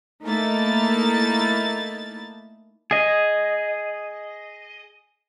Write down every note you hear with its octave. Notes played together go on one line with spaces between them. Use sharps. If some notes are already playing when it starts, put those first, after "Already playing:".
A3 A#3 D#4 E4 A5 A6
G#4 D#5